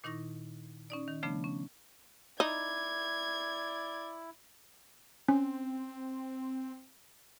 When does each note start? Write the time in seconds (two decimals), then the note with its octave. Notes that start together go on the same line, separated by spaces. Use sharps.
0.04 A#2 D#3 D#4 E4 C#6 A#6
0.90 C#4 D#4 D5
1.08 D#3
1.23 C#3 F3 A3 B3 D4
1.44 C#4
2.40 D#4 E4 D5 G#6
5.28 C4 C#4